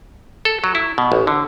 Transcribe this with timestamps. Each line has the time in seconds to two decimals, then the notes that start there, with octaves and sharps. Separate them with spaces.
0.45 A4
0.64 F#3
0.75 E4
0.98 B2
1.12 A1
1.27 D3